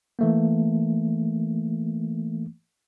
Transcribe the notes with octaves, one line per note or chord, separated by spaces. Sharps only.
E3 A3 A#3